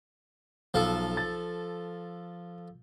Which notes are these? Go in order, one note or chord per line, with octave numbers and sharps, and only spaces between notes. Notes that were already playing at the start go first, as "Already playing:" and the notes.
B1 F3 A4
A6